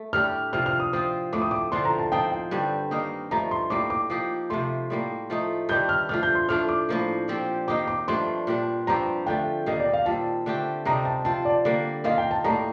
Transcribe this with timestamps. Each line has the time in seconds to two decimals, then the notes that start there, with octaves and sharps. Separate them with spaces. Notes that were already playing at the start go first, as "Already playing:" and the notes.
Already playing: A3
0.13 A2 G3 D4 G4 F6
0.53 C3 F3 C4 F6
0.66 F6
0.80 D#6
0.93 F3 C4 F4 D#6
1.33 A2 A3 C4 D6
1.41 D#6
1.51 D6
1.72 D3 F3 C4 F4 C6
1.85 A#5
1.99 A5
2.12 F3 C4 D#4 G5
2.32 G5
2.51 G2 D3 G3 C4
2.91 D#3 A#3 D#4
3.31 G2 F3 A3 A#5
3.51 C6
3.70 A2 G3 A#3 D6
3.90 D6
4.10 F3 A#3 D#4 G4
4.50 C3 F3 A3 C6
4.90 A2 G3 A#3
5.30 F3 A3 D#4
5.69 G2 D#3 G3 D4 G6
5.89 F6
6.09 F3 A3 D4 F6
6.23 G6
6.35 C6
6.48 A2 A3 D4 F4 F6
6.69 D6
6.89 A2 F3 A#3
7.28 A#2 F3 C4 G4
7.68 D#3 A#3 D#4 G4 D6
7.88 D6
8.08 G2 F3 A3 D4 C6
8.47 A#2 G3 D4
8.87 G2 F3 C4 G4 A#5
9.26 D3 F3 A3 G5
9.66 D#3 G3 A#3 D#5
9.80 D5
9.93 F5
10.06 A#2 G3 C4 A5
10.46 D3 A3 C4 G4
10.85 C3 G3 C4 D#4 A#5
11.05 A5
11.25 F3 C4 F4 A5
11.45 D5
11.65 D3 G3 A#3
12.04 D#3 A#3 F4 F5
12.18 G5
12.31 A5
12.44 A2 G3 A#3 A#5